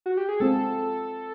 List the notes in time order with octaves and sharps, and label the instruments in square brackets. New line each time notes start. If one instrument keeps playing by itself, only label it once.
[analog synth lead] F#4
G4
G#4
[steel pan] G#3 C4 F4 [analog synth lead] A4